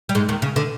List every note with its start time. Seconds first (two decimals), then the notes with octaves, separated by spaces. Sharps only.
0.09 G3
0.15 G#2 G#3
0.29 D#2 D#3
0.42 C#3
0.56 D3